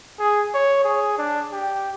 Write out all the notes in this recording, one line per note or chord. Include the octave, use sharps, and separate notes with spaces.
G#4
C#5
G#4
D4
G4